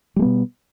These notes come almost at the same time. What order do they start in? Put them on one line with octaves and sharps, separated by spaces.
G3 G#3 B3 B2